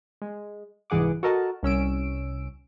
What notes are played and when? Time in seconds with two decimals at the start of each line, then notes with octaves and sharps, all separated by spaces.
0.22 G#3
0.90 C2 G#2 E3 G#4 F#5 D6
1.23 F#4 A4 A#4 D#5 A5
1.63 C2 C#4 E6 D7